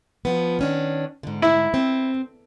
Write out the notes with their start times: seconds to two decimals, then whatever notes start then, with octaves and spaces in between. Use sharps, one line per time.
0.25 F3 B3
0.59 D#3 C#4 D4
1.23 G#2 D3
1.42 E4
1.74 C4